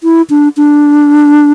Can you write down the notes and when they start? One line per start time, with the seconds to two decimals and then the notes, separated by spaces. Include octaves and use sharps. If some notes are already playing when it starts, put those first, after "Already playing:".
0.03 E4
0.30 D4
0.57 D4